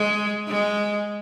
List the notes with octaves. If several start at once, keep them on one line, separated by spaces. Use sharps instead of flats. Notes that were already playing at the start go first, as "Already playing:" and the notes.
Already playing: G#3
G#3